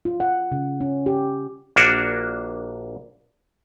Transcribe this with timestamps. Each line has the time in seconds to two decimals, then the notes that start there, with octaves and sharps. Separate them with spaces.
0.05 F4
0.20 F#5
0.52 C#3
0.80 C#4
1.06 G4
1.76 A#1 A#3 D4 F#4